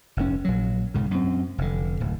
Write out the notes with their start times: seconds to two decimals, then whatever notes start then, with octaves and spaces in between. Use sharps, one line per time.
0.17 F1 G#2 C#4
0.45 A#1 F#3
0.94 B1 G#2 C#3
1.11 F#2 C4
1.58 F1 D3
2.00 D1 A2